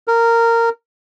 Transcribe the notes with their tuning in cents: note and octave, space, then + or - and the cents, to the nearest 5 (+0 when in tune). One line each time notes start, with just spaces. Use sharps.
A#4 -15